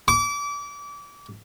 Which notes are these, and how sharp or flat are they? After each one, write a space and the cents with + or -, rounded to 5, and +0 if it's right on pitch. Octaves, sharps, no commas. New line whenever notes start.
D6 -30